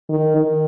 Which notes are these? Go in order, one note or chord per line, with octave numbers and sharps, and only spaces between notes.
D#3
D#3